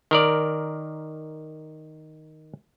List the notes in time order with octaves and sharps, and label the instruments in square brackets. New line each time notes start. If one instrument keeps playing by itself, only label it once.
[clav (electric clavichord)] D#3 A#4 D5